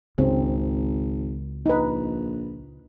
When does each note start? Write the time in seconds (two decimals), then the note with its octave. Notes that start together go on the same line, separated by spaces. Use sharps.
0.18 G#1 C#2 C#3 C4
1.66 A#1 D#4 B4